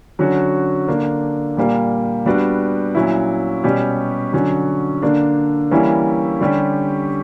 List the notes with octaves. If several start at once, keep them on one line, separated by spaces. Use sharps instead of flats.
D3 F#3 C#4 F#4
D3 A#3 D4
A#2 G3 A#3
G3 B3 D4 F#4
A#2 F#3 C#4 E4
B2 G3 C#4 G4
D3 F#3 C#4
D3 A#3 D4
E3 G3 A#3 C#4 E4
D3 G3 C#4 G4